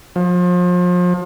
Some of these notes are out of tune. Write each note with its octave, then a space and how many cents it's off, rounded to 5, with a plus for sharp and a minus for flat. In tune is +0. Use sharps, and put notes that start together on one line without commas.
F3 +35